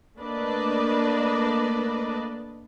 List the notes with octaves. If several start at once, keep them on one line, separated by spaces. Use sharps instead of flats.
A3 A#3 D4 B4 D5 D#5